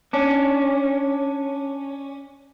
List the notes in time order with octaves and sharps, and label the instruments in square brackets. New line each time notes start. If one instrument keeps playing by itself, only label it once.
[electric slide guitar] C#4 D4